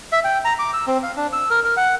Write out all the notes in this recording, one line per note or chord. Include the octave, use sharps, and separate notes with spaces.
E5
G5
A#5
D6
E6
C4
F5
D4
E6
A#4
A#4
F#5